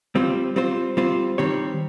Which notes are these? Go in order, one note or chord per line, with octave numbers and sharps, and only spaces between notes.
G3 C4 F4 C5
G3 C4 F4 C5
G3 C4 F4 C5
D#3 G3 C4 G4 C#5